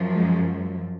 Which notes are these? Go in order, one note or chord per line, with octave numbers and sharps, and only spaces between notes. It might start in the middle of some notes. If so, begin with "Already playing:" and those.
Already playing: F#2 F3
G#3